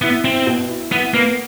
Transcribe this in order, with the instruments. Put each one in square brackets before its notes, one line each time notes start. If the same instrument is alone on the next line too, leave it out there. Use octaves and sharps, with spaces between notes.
[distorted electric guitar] B3 [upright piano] E4
[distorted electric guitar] C4 [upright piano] E4
[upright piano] B2
E4
[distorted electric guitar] B3 [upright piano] E4
[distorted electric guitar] A#3 [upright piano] B3